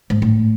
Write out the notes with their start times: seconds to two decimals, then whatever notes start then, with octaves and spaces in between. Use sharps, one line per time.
0.10 G#2
0.22 A2